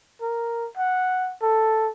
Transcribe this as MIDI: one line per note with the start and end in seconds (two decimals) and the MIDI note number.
0.22 0.67 70
0.77 1.34 78
1.42 1.89 69